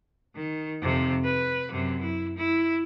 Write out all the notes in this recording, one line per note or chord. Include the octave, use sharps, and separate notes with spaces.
D#3
F2 C3
B4
F#2 C3
E4
E4